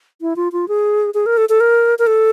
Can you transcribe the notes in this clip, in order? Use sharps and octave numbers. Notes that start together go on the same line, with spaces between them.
E4
F4
F4
G#4
G#4
A#4
A4
A4
A#4
A#4
A4